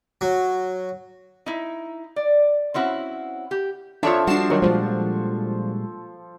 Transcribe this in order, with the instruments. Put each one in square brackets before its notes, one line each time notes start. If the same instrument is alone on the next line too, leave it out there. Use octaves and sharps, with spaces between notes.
[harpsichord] F#3
[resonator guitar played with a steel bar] D#4 E4
D5
C4 C#4 E4 F#4
G4
[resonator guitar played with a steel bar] F2 E5 [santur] F3 A4 C#6 [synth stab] D4 C#5
[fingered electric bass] G3 [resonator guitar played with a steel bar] D4 F#4 [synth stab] C7 E7
[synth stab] D#3 F#3 [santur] C#6
[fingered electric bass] A#2 G3 G#3 [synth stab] F3